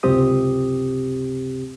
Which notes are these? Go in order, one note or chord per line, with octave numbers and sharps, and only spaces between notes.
C#2 F#2 C3 C4 G4 D#6